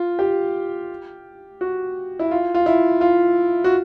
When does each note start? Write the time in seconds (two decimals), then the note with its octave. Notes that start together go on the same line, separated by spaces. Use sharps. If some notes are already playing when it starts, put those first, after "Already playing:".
Already playing: F4
0.19 G4
1.61 F#4
2.19 E4
2.31 F4
2.54 F4
2.66 E4
3.01 F4
3.64 F#4